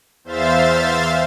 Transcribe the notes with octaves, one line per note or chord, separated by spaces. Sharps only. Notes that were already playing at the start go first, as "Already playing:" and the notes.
E2 C5 E5 F5 A6